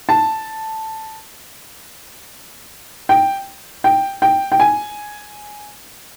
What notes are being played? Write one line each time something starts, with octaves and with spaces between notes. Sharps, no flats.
A5
G5
G5
G5
G5
G#5